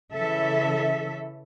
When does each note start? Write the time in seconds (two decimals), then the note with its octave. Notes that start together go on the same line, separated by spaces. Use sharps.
0.14 C#3 E3 A4 E5